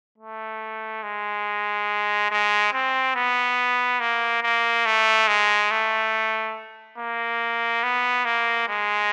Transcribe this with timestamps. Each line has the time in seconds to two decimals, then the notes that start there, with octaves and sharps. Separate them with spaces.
0.18 A3
1.03 G#3
2.31 G#3
2.73 C4
3.16 B3
4.00 A#3
4.43 A#3
4.86 A3
5.28 G#3
5.71 A3
6.98 A#3
7.84 B3
8.25 A#3
8.68 G#3